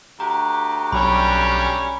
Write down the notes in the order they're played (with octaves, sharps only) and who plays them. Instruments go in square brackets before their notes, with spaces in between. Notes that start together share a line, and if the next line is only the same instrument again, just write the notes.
[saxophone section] D2 F#4 G4 [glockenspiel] A#5
[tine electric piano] B1 [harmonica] G3 C#4 [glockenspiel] B5